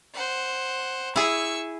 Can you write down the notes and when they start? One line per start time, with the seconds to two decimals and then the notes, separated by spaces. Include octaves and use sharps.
0.14 C5 F#5
1.16 E4 G#4 C#6 E6